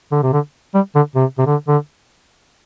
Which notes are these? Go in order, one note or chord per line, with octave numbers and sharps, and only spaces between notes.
D3
C3
D3
G3
D3
C3
C3
D3
D3